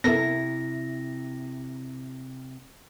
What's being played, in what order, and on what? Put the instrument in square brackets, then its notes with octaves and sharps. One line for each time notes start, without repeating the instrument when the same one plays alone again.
[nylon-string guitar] C3 E4 [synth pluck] B3 A4 A#4 [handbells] A#6